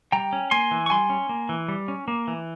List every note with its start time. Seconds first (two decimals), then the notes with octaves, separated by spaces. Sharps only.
0.12 G3 G5 A#5
0.33 C#4
0.51 A#3 G#5 C6
0.71 E3
0.86 C#6
0.90 G3 G#5 C6
1.10 C#4
1.29 A#3
1.49 E3
1.68 G3
1.88 C#4
2.08 A#3
2.28 E3